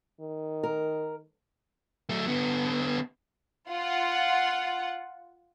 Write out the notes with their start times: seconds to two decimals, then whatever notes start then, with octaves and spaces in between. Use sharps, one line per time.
0.20 D#3
0.63 A#4
2.09 F#3 A3
2.27 D3 B3
3.69 F4 F#5